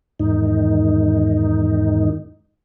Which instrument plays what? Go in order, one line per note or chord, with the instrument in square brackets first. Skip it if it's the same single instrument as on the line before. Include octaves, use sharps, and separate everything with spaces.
[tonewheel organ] E2 G#2 D#3 D#4